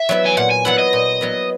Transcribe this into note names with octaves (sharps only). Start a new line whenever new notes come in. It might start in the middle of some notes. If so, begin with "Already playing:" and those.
Already playing: E5
F#3 B3 E4
G#5
A#2 F#5
G#5
F#3 B3 E4 F#5
D#5
A#2
F#3 B3 E4